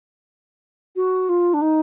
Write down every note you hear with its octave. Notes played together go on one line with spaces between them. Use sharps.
F#4
F4
D4
D#4